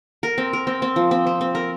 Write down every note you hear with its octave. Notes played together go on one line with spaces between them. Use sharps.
A#4
C4
A#4
C4
C4
F3
C4
C4
C4
A#4